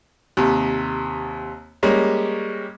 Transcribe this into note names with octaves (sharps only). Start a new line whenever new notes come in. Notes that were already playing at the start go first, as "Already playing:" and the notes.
D#2 C3
G3 G#3 A#3 C#4